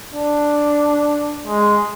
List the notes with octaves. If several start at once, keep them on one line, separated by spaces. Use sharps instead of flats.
D4
G#3